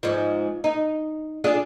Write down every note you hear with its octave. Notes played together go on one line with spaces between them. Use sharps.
G#2 F3
D#4
D4 F4 G#4